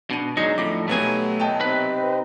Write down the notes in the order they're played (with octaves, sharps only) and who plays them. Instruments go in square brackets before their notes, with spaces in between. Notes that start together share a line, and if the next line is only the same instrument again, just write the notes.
[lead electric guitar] B2 [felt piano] D4 D#7
[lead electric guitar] F#3 G#3 [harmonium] D4 [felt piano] D#4 [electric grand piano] C#7
[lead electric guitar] F2 A2 [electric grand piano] D6
[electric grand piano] B2 F#3 B3 [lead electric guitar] A3 G#5 [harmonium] G4
[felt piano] D#5 G5 A5
[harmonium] C3 C4 D#4 [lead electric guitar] B4